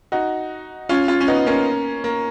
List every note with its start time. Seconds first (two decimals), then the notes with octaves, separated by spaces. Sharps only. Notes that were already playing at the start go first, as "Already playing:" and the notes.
0.12 D#4 F#4
0.89 C#4 F4
1.08 C#4 F4
1.21 C#4
1.28 B3 D#4
1.46 A#3 C#4
2.04 A#3